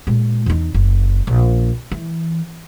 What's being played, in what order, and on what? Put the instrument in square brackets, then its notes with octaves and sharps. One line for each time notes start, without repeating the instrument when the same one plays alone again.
[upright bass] A#2 G#3
E2 D#4
F#1
A#1
E3